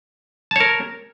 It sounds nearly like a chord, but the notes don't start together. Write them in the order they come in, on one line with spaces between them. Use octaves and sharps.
A5 C#5 A#4